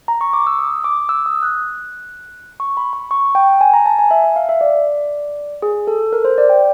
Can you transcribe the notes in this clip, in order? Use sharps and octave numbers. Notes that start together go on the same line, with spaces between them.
A#5
C#6
D6
E6
D#6
D6
E6
D#6
F#6
C#6
B5
B5
C#6
G5
G#5
A#5
A5
G#5
E5
E5
F5
E5
D5
G#4
A4
A#4
C5
D5
G5